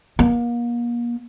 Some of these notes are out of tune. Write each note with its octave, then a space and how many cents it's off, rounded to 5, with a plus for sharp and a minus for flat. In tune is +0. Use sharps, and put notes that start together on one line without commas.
A#3 +35